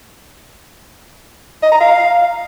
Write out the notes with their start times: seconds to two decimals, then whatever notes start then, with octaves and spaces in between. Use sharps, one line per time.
1.62 D#5
1.71 A#5
1.81 F5